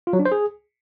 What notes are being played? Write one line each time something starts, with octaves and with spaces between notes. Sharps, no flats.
F4
F#3
D4
C5
G#4